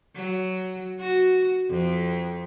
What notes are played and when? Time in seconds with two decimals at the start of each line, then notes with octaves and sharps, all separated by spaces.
0.16 F#3
1.00 F#4
1.70 F2